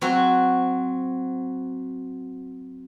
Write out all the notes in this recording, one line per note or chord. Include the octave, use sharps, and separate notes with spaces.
F#3 C4 F#4